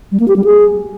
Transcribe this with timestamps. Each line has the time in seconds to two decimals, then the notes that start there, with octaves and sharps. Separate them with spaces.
0.12 G3
0.20 A#3
0.28 G4
0.36 G3
0.44 G#4